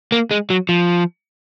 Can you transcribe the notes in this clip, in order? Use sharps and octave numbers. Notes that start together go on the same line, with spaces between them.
A#3
G#3
F#3
F3